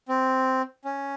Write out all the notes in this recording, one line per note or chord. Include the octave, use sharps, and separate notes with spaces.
C4
C#4